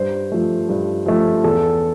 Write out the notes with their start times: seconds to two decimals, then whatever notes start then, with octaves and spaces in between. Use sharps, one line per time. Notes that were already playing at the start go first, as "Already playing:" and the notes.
Already playing: G2 C5
0.32 F3 A3
0.69 G2
1.06 F3 A3
1.43 E2 A4